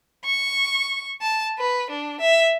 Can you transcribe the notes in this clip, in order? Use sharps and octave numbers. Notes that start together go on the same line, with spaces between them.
C#6
A5
B4
D4
E5